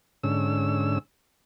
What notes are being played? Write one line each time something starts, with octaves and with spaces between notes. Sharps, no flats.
G#2 D3 C#4 E6